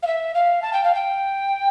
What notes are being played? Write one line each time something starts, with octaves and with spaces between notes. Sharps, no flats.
F5
E5
F5
A5
G5
F5
G5